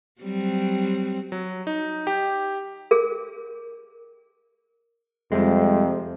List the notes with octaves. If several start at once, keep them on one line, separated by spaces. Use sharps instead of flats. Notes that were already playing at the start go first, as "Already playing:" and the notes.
F#3 G3 C4
F#3
D#4
G4
G#4 A#4
F2 C3 G3 G#3